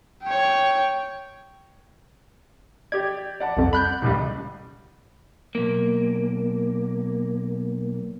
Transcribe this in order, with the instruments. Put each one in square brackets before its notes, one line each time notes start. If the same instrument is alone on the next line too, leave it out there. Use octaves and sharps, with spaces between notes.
[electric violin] C#5 G5
[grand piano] G4 D5 [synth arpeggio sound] G#6
[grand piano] D5 F#5 A5
[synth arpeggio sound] C2 F2
B5 F#6 G6
[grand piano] D#1 C#2 G3
[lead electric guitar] B1 A#3